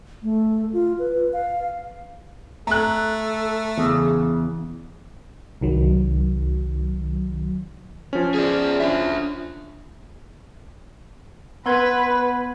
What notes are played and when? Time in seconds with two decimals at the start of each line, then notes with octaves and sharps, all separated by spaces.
0.23 A3
0.73 F4
0.99 B4
1.33 F5
2.67 A3 A4 A#5 F#6
3.78 E2 C#3
5.61 C2 D#3 F#3
8.13 F3 C#4
8.34 G#4 D5
8.80 D4 E5
11.66 B3 B4 C6 G#6